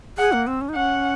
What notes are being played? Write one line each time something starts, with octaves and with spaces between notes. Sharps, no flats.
G#4 F#5
A#3
C4
C#4
D#4
C#4 F#5